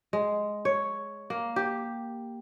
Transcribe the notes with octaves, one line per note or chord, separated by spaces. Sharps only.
G#3
C#5
A#3
G4